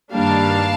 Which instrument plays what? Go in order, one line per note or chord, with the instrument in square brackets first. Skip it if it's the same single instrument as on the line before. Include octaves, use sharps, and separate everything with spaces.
[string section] G2 D#3 G3 A#3 D4 F5 A5